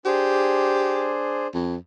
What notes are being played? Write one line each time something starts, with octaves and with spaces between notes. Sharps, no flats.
D4 G4 G#4 C5
F2